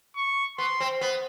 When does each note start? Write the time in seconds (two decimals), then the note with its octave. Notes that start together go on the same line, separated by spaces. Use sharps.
0.16 C#6
0.58 B3 C6
0.80 C4
1.01 B3